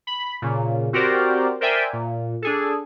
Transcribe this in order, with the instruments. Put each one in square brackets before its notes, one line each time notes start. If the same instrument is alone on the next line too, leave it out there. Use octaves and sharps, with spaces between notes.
[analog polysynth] B5
A#2 C#3
C4 F#4 G4 A#4 C5 D5
A#4 C5 D5 E5 G5 G#5
A#2
D4 G#4 A4